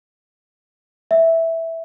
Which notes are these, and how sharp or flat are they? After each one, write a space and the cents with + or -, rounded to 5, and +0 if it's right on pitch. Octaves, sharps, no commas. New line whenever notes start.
E5 -5